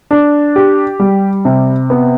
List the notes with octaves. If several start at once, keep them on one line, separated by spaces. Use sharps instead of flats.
D4
G4
G3
C3
B3